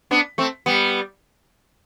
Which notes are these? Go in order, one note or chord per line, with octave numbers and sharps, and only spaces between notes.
B3 D4
A3 C4
G3 B3